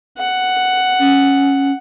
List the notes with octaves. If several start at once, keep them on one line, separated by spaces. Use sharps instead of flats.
F#5
C#4